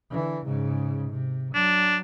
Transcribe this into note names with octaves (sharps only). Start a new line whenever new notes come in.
D3 E3
G#2 C#3
C3
F#3 D4